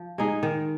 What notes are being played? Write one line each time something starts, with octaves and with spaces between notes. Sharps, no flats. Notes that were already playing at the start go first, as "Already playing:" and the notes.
Already playing: F3
G#3 D#4 G#4
D#3